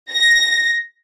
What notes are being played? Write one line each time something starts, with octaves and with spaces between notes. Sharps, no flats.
A#6